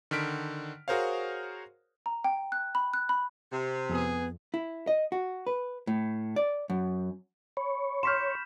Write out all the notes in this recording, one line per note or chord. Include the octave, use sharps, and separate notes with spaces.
D3 D#3 F6 B6 D7
F#4 G#4 A#4 C5 C#5 F5
A#5
G5
F#6
B5
F#6
B5
C3
F2 B3 G#4
E4
D#5
F#4
B4
A2
D5
F#2
C#5 B5
C6 C#6 F6 G6 B6 E7